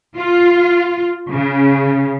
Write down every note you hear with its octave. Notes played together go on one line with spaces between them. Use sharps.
F4
C#3